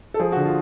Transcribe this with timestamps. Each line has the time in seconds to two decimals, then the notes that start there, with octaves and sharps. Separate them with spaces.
0.14 A4
0.19 F3 G#4
0.32 D3 F#4
0.45 F4